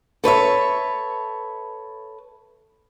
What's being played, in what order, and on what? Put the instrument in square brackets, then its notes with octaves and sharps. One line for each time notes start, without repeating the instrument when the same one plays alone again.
[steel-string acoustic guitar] A4 B4 C#5 E5